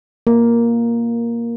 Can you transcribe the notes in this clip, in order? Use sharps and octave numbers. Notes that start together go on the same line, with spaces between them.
A#3